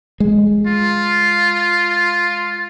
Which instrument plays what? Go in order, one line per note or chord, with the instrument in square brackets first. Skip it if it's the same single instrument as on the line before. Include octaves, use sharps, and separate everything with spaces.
[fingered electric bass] G#3
[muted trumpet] F4